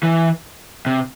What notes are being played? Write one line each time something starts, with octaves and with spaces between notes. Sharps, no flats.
E3
C3